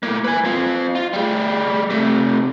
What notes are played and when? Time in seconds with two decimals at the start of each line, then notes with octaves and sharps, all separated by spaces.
0.03 A2 A#3
0.25 B4 G#5
0.45 C4 F4
0.95 F4
1.13 G3 G#4
1.90 C3 A3